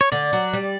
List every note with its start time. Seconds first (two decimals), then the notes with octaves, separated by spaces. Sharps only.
0.01 C#5
0.12 D3 D5
0.33 F#3
0.53 G3